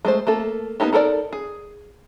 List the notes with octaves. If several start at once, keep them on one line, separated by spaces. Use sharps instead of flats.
G#3 A3 C5
A3 A#3 A4
A#3 B3 C#4 D#4 G4
D#4 A4 A#4 C5 D5
G#4